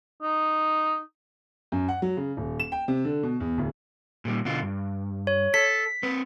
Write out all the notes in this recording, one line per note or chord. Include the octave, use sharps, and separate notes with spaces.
D#4
F#2
F#5
F#3
C#3
D#1
E7
G5
C3
D3
B2
E2
D1
A#2 G3
B2 D3 F4
G2
C#5
A4 B6
C4 B4